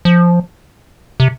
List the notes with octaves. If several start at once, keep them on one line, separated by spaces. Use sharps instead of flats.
F3
C3